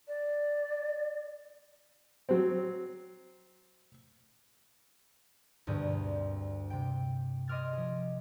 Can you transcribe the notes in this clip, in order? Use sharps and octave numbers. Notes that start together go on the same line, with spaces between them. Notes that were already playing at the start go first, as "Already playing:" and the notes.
D5
F#3 C4
D2 G2 B2 G#4 G6
A#3 C4
C3 G5
D#5 C6 D6 F6 G#6 A6
F3 G#4